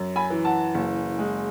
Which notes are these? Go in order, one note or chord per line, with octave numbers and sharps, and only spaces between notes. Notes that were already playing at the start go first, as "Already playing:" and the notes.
Already playing: F#2
G#5 B5
E3
F#5 A5
F#1
G#3